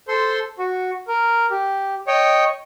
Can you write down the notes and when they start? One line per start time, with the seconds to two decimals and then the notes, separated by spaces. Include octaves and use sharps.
0.08 A4 C5 C6
0.59 F#4
1.08 A#4
1.51 G4
2.07 C#5 D#5 G5 C#6